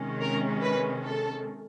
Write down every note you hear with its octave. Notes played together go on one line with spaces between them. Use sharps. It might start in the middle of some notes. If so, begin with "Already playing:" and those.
Already playing: C3 D#3 G#3 C#4
A#4
B4
A4